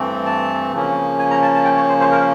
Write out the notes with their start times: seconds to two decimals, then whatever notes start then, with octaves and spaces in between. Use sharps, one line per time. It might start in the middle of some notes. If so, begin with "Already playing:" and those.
Already playing: G2 E3 A3 C4
0.26 A5
0.73 C#3 F3 A#3 C#4
1.19 G#5
1.31 A#5
1.42 A5
1.54 A5
1.65 G5
1.76 C#5
1.89 C5
2.00 C5
2.11 A#4